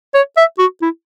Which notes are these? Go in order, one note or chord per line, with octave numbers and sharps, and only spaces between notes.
C#5
E5
F#4
E4